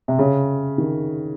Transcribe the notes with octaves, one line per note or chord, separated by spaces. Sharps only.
C3
C#3
D#3